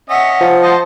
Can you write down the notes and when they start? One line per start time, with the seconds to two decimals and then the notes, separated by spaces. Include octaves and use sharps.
0.10 C#4 D#5 E5 F#5
0.40 F3
0.62 C5 D#5 A5